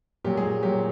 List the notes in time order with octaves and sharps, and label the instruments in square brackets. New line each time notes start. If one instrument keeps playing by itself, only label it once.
[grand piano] A#2 F#3 G4
G#3 G#4
A#2 F#3 G4